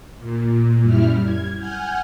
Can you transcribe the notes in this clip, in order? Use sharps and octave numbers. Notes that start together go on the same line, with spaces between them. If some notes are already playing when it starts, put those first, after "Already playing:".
A#2
F#2 G3 E4 F6
G#6
F#5 G#5 F6 G6 G#6